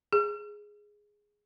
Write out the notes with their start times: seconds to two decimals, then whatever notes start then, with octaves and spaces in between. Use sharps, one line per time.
0.13 G#4